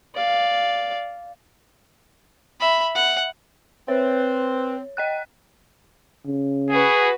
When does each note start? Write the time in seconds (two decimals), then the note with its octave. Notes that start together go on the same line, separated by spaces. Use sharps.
0.15 D5 F5
2.60 E5 B5
2.95 F#5
3.88 C4 B4 C#5
4.97 D#5 G5 F#6
6.26 C#3
6.70 F#4 G#4 B4